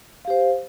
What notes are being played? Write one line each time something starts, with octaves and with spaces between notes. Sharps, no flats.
G4 C5 F5